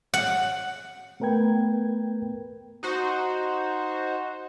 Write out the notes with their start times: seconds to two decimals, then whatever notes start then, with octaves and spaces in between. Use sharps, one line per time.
0.14 F#5
1.20 A3 B3 A#4 B4 G5 G#6
2.83 D#4 F#4 C5